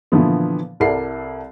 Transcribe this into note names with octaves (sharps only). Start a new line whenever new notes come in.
A#2 D3 E3 F3 B3
C2 E4 A4 A#4 D5 C7